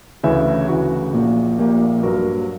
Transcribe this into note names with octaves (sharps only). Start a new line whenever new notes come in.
D2 C#3 E3 C#5 E5
D2 C#3 E3 F#4
A#1 A#2 A#3
A#1 A#2 A#3 G4
G2 F#3 A#3 F#4 A#4